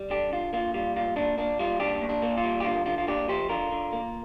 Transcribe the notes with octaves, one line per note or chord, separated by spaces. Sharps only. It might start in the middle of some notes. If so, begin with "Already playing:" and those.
Already playing: G3
D3 D4 G4
D3 F4
A#3 F4
G3 F4
A#2 F4
A#2 D4
A#3 D4
G3 F4
A#2 D4 G4
A#2
D4
A#3
F4
G3
G4
D3 F4
D3 F4
F4
A#3 D4 G4
F3 G4 C5
D3 F4 A#4
D3
A#3